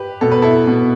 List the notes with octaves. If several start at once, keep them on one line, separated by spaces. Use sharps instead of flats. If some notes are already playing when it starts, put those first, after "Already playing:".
Already playing: G4 B4
B2 A4
B4
E4 A4
B2